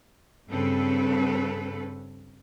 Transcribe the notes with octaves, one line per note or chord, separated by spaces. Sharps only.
G2 C#3 C4 A4 B4